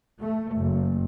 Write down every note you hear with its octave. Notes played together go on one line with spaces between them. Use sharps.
A3
F#1